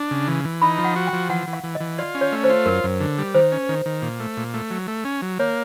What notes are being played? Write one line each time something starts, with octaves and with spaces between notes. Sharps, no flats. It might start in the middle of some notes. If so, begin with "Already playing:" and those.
Already playing: D4
C#3
E3
E3
D#4 B5
F3
F#5
F#4
G5
F3
E3 F#5
E3
F5
E3
D#5
E3
F4 D5
C#4
C#5
A3
C5
F4
F#2 A#4
F#2
D3
G3
D#3 C5
C#4
D#3
D#3
A#2
A3
A#2
A3
F#3
A3
C#4
F#3
A#3 C#5